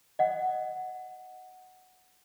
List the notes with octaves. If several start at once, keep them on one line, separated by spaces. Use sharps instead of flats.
D#5 F#5